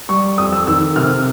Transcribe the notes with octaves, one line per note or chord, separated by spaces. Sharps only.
G3 C#6
F2 D#6
E6
D#3 E6
C3 F6